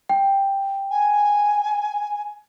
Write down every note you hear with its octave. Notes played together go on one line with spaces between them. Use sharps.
G5
G#5